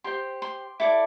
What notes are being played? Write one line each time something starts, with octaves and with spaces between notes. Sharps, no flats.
G4 C5 C6
C6
E4 A4 D5 D6